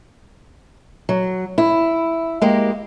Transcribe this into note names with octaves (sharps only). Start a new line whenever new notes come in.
F#3
E4
G#3 A#3 G4